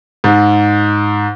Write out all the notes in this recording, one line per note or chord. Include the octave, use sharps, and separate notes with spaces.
G#2